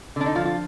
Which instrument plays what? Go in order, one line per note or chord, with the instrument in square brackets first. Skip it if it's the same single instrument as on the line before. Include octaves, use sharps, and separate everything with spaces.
[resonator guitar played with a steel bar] D3 D4
D#4
F3 F4
F4